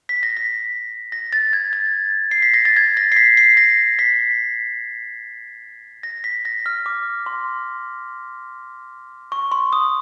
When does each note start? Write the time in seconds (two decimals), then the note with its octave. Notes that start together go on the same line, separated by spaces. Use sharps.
0.09 B6
0.23 A#6
0.37 B6
1.12 A#6
1.33 A6
1.53 G#6
1.73 A6
2.31 C7
2.42 B6
2.54 A#6
2.65 A6
2.76 G#6
2.97 A#6
3.12 C7
3.17 B6
3.37 C7
3.57 A#6
3.99 B6
6.03 A#6
6.24 B6
6.45 A#6
6.66 F6
6.86 D6
7.26 C6
9.32 C#6
9.52 C6
9.73 D#6